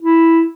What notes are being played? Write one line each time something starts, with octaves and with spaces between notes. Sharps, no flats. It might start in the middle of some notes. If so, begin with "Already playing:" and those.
E4